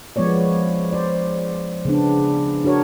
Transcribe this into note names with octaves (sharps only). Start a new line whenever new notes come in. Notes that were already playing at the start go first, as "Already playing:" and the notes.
F3 G#3 B3 C#5 D5
C5 D5
C#3 B3 D4
D4 F#4 A#4 C#5